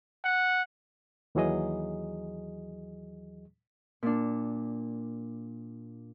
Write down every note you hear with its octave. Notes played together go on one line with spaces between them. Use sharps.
F#5
D#2 E3 F#3 G#4 D#5
A#2 D4